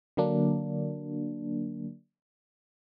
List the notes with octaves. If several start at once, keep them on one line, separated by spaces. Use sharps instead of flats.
D3 F#3 A#3 D4